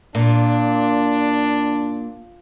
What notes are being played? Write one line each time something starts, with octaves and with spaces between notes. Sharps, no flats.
A#2 D4